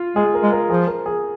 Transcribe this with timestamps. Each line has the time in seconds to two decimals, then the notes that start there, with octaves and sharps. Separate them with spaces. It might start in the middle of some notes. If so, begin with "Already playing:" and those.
Already playing: F4
0.16 G#3 G#4
0.34 A#4
0.43 G#3
0.52 A#4
0.70 F3 G#4
0.87 A#4
1.06 G#4